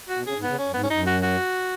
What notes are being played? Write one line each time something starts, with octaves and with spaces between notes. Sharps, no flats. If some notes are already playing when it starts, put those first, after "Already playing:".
F#4
B2
C#3 G#4
G#2
B3
C#3
C#4
F#2
G#2 B3
C#4
F#2 D#4
F#4
F#4